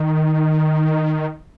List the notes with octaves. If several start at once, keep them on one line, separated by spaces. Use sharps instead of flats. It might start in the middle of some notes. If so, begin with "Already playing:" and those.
Already playing: D#3